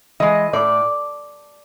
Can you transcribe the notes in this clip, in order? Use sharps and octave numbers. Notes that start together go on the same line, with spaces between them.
E3 G#3 D#5
A2 D5